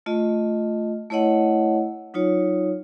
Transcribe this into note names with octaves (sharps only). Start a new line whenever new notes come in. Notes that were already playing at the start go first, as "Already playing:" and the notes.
A3 F4 D#5
A3 E4 C#5 D#5 F#5
F#3 D#4 F4 C#5